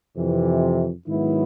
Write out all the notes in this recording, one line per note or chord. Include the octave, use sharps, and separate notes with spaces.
F2 C3 E3
G#2 D#3 F#3 B3 E4